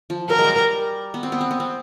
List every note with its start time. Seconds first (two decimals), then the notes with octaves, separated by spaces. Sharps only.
0.10 F3
0.30 F#3 A#4
0.38 G#3
0.44 G3
0.58 G3
1.14 B3
1.23 C4
1.32 B3
1.41 C4
1.51 B3
1.60 C4